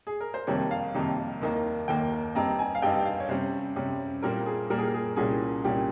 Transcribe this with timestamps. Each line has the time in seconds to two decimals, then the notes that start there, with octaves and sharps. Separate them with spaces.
0.07 G#4
0.21 A#4
0.34 C5
0.47 F2 C3 D#3 G3 A#3 C#5
0.71 F5
0.94 F2 C3 D#3 G3 A#3
1.42 D#2 D#3 A#3
1.88 D#2 D#3 A#3 G5
2.35 G2 G3 C4 D#4 A#5
2.59 G#5
2.75 F5
2.82 G2 G3 C4 D#4 G5
3.05 F5
3.20 C#5
3.29 C3 G3 C#4 C5
3.76 C3 G3 C#4
4.22 A#2 G3 A#3 A#4
4.46 G#4
4.70 A#2 G3 A#3 A#4
4.78 G#4
4.85 A#4
4.94 G#4
5.16 C2 A#2 G3 C#4 G#4
5.64 C2 A#2 G3 C#4 G4